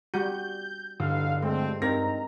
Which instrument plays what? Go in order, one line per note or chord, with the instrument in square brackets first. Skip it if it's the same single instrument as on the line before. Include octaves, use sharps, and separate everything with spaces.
[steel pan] G3 F#4 [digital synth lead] G6
[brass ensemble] B1 E2 F5 [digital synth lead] G2 [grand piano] D3
[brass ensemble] F3 A3 C4 [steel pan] G#3
[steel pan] C4 A#4 [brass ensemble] D#4 A#5 [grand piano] A#6